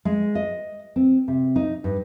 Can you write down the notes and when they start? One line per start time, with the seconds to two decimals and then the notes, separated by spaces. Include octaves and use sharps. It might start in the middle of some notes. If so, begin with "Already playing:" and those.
0.05 G#3
0.35 D#5
0.96 C4
1.28 C3
1.56 D#4
1.84 G2